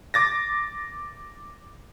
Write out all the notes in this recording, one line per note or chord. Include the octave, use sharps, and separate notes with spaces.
D6 A6 A#6